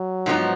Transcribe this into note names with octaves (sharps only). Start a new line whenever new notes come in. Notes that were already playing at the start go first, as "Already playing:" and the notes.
Already playing: F#3
G#2 F3 B3 D#4